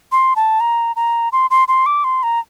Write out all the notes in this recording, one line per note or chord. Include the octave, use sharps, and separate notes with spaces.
C6
A5
A#5
A#5
C6
C6
C6
D6
C6
A#5